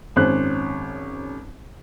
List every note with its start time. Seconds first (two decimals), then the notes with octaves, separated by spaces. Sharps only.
0.16 G#1 F#2 C#4 C5 F#6